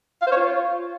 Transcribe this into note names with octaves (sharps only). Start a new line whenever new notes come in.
F5
C5
C#5
F4